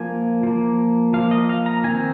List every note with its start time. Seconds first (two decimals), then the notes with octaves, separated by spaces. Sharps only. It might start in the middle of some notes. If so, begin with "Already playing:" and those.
Already playing: F3 A#3 G#5
0.43 F3 A#3
1.13 F3 A#3 F5
1.31 D#5
1.49 F5
1.66 A#5
1.84 D#3 C4 G#5